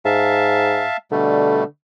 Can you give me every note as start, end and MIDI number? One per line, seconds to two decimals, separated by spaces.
0.05 0.85 44
0.05 0.97 76
0.05 0.97 77
0.05 0.97 81
1.12 1.64 47
1.12 1.63 50
1.12 1.64 55
1.12 1.64 57